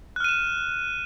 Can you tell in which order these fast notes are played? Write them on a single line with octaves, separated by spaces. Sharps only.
F#6 F6 D#7 E7